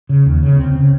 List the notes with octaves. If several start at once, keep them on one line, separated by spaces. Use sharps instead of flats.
C#3
D#2
C#3
C#4
C#2 C4
C#3